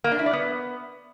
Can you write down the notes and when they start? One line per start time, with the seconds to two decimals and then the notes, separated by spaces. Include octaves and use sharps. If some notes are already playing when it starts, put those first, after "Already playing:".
0.04 A#3
0.12 D4
0.19 E4
0.26 D5
0.33 B3